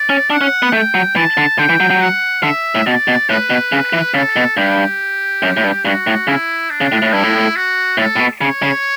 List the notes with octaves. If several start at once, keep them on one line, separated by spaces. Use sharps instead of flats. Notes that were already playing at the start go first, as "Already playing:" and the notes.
Already playing: D5
C#4
D4 F#5
C#4
B3
A3 G5
F#3
E3 A5
D3
D3 G5
E3
F#3
F#3
F#5
D3 E5
A2
B2 D5
B2
A2 B4
B2
C#3
E3
C#3 A4
B2
G2 G4
F#2
A2
G2
G2 F#4
A2
C#3 E4
D4
C#3
A2
A2
G2 E4
A2
F#4
A2 A4
A2
B2
C#3 C#5
C#3